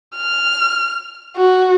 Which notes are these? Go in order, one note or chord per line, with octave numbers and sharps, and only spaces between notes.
F6
F#4